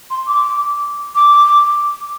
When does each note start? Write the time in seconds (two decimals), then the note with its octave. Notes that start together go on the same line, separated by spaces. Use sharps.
0.10 C6
0.27 D6
1.16 D6